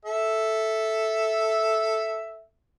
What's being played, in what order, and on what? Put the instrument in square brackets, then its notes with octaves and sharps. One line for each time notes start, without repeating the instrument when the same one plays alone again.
[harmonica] A4 E5